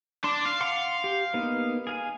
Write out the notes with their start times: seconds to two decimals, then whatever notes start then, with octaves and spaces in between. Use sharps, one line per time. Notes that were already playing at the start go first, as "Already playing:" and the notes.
0.24 D4 C6 D6
0.46 F5
0.61 F#5 C6 D6
1.04 G4
1.34 A#3 B3 D#4
1.87 G#4 F5 G#5